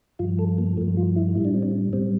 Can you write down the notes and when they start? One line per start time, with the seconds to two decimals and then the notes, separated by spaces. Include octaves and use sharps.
0.19 G2 F3 F4
0.39 A4
0.58 A#3
0.77 G2 F3 A3
0.97 F4
1.16 E4
1.35 A2 G3 E4
1.45 D4
1.54 C4
1.63 D4
1.93 A2 G3 C4